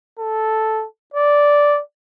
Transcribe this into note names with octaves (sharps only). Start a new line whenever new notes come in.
A4
D5